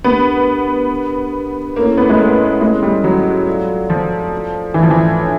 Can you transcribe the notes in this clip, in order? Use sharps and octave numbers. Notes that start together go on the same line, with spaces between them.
B3 D4 G4 A#4
A#3 C#4 E4 A4 C#5
B3
G#3
A3
G#3
G3
F#3
F4 A4 D5 F5
F3
E3
F3
E3
D4 F4 A4 C#5